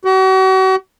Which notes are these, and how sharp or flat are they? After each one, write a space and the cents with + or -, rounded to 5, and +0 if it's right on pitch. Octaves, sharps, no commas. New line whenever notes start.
F#4 +40